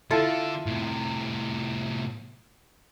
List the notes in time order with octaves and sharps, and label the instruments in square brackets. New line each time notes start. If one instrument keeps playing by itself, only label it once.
[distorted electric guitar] D3 [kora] E4 F4 A4
[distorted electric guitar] A2 C3